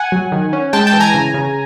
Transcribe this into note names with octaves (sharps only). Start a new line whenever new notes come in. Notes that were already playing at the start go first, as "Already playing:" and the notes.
Already playing: F#5 G#5
F#3
D#3
C#4
G#3 G5 A5
G5 A5
E3
G#5 A#5
C#3
C#3